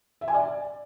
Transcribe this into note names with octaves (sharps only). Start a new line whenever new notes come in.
E5
G#5
D5